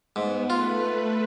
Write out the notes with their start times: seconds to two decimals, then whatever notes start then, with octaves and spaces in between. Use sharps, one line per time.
0.16 G#2 B3
0.50 A3 F4 B4